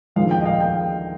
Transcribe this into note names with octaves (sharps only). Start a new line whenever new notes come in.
D#2 D3 F3 G#3 D4 F5
G5
D#5
F5
G5